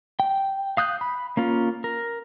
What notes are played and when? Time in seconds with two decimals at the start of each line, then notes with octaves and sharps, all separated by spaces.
0.20 G5
0.77 F5 D#6 F#6 G6
1.01 B5
1.37 A#3 C#4 F4
1.84 A#4